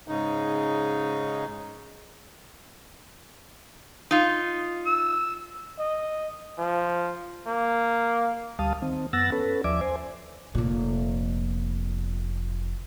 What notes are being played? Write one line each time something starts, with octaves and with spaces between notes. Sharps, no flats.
G#2 C#3 D#4
D#4 F4
E6
D#5
F3
A#3
D2 G3 F5 A5 D#6
D#3 C4
F#2 B3 F#5 E6 A6 A#6
C#4 A4 B4
D#2 F3 D5 E5 G#5 D6
C5 G#5
F1 A#2